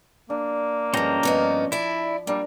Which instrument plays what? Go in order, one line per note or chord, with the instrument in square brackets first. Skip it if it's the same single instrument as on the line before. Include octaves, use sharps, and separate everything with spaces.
[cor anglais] A#3 [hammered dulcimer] D4
[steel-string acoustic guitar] G2 G#3 [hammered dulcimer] F3 [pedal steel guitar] C#4 G5 A#5
[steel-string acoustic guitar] G2 B3 D#4
[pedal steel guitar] E4 [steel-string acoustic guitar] D5 E5
[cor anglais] G3 [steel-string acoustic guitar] A#3 [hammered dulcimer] D4 A#4